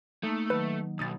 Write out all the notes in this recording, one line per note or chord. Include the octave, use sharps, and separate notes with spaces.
A3 A#3 D#4
D#3 F#3 B4
B1 D#6 A6